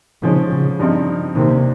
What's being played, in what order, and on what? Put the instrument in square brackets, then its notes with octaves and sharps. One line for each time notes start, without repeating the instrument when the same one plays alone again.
[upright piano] G#2 F3 G#3 C#4 [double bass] C#3
[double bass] C#3
[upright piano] G2 F3 C4 D#4
[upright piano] D#2 D#3 A#3 [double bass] C3